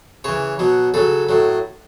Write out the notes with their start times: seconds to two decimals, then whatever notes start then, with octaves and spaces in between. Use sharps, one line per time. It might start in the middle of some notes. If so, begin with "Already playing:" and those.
0.24 C#3 E3 C#5
0.59 B2 F#3
0.94 C#3 F#3 A4
1.29 A2 F#3